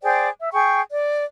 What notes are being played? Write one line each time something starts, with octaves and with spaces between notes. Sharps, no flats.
G#4 C5 D5 G5
E5
G#4 G5 C#6
D5